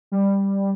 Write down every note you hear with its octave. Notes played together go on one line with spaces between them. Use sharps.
G3